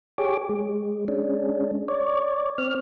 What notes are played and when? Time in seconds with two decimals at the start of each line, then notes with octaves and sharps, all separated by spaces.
0.18 G4 G#4 C#5 D6
0.49 G#3
1.08 G#3 C#4 D4
1.88 C#5 D5
2.58 C4 F6